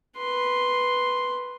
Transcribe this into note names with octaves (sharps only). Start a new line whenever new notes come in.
B4 C6